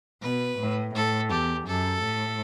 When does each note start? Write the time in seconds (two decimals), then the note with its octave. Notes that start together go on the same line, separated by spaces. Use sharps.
0.22 B2 B4
0.59 A2
0.95 A2 A4
1.31 E2 G4
1.67 F#2 A4
2.03 A2